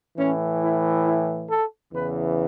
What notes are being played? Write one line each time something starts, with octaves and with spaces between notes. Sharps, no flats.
A2 E3 C#4
E4
E4
A4
E2 C#3 E3 B4